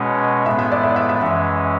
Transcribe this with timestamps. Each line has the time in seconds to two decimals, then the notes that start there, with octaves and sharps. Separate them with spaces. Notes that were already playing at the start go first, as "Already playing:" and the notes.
Already playing: B2 G#3 C#4 F#5
0.46 A2 G#3 B3 E5
0.59 E5
0.71 D5
0.83 E5
0.96 E5
1.09 E5
1.21 F#2 E3 G#3 C#4